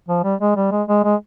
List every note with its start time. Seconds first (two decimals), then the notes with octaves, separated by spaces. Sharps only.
0.09 F3
0.24 G3
0.41 G#3
0.56 G3
0.71 G#3
0.88 G#3
1.04 G#3